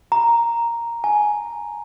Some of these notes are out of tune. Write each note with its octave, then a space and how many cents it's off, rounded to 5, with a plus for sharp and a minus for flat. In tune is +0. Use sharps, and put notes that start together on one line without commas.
A#5 +0
G#5 +15